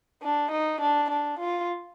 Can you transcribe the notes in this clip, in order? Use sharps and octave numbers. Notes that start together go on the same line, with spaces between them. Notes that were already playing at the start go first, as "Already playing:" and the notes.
D4
D#4
D4
D4
F4